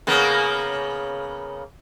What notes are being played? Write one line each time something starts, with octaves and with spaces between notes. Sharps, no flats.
C#3 A#3 B3